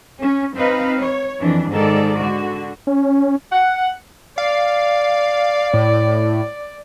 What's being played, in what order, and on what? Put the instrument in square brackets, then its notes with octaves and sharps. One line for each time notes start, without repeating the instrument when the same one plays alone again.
[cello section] C#4
C4 D#4 B4 F5
C#5
F2 E3 D4
G#2 D#3 G#3 A4 D5
D3 F#4
[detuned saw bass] C#4
[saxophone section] F#5
[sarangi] D5 [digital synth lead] F5
[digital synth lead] A2